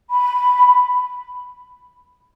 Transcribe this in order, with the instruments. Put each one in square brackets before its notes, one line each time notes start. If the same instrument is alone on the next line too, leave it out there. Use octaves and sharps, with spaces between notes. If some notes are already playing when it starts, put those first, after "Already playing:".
[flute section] B5